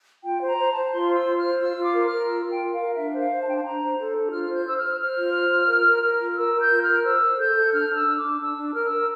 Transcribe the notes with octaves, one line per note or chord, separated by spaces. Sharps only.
F4 G5
C5
A#5
C5
A5
C5
F4 C6
C5
E6
F4
F6
C5
F4 E6
F4
D6
A#4
F6
A#4
F4 E6
F4
G5
A#4
F5
A#4
D4 E5
C5
F5
C5
A5
D4 G5
A5
D4 A#5
C5
A4
D4
F4 F6
F6
C5
G6
C5 E6
F6
C5
C5 F6
F4
C5
F4
A#4
A#4
A#4
F4
A#4 E6
A#4
G6
F4
F6
A#4
C5 E6
C5
A4 G6
A4
D4 F6
D4
E6
D4
D6
D4
D4 E6
D4
A#4 F6
E6
A#4